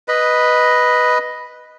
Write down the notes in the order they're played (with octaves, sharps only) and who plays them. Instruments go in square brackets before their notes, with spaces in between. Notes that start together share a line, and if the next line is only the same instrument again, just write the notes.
[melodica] B4 D#5 B5